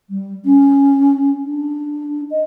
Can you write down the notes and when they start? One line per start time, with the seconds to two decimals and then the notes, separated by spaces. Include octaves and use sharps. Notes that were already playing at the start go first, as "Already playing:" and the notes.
0.09 G3
0.45 C#4
1.45 D4
2.30 D#5